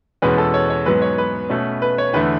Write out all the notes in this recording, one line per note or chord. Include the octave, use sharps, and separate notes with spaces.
E2 B2 G#3 C#4 B4
A4
C#5
C#5
G#2 F#3 B3 B4
C#5
B4
B2 A3 C#4
B4
C#5
E2 D3 A3 B4